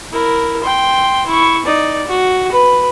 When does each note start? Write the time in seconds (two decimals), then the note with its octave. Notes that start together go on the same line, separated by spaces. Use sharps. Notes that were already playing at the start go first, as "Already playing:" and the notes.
0.12 E4 A#4
0.63 G5 C6
1.27 E4 C#6
1.65 D#4 D5
2.07 F#4
2.51 B4 B5